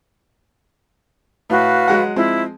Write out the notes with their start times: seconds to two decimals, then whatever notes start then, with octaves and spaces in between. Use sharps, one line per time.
1.50 A2 F#4 B4 F5
1.88 F#3 G#3 F#5
2.16 F3 G#3 C4 E4